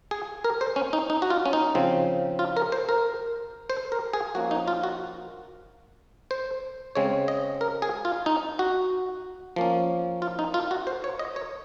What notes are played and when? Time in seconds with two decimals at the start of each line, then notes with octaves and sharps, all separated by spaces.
0.11 G#4
0.44 A#4
0.61 C5
0.76 C#4
0.93 D#4
1.10 D#4
1.22 F#4
1.30 F4
1.46 C#4
1.53 D#4
1.75 C#3 F3 C4
2.39 F4
2.57 A#4
2.72 C5
2.89 A#4
3.70 C5
3.92 A#4
4.13 G#4
4.35 F3 A#3 C#4 F#4
4.51 D#4
4.68 F4
4.83 F#4
6.31 C5
6.95 C#3 G#3 C4 C#5
7.28 D#5
7.61 A#4
7.82 G#4
8.05 F4
8.26 D#4
8.59 F#4
9.56 F3 A#3 C#4
10.22 F4
10.39 D#4
10.54 F4
10.71 F#4
10.87 C5
11.04 C#5
11.19 D#5
11.36 C#5